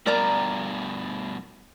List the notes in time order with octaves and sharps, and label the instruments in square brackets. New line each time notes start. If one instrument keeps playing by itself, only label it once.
[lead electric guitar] G2 B2 [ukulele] A#4 D5 A#5